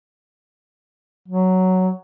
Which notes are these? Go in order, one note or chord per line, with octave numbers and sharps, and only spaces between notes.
F#3